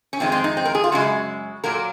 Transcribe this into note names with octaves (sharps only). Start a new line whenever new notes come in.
C#4
F2 D#3 G#3 C4
C4
D#4
C4
A#4
G#4
F4
F#2 C#3 G#3 F#4
A#2 F#3 A#3 A#4